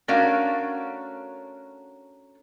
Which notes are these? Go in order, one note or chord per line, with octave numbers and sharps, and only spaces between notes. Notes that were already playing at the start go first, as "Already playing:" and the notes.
A3 C#4 D4 F#4 A#4 F5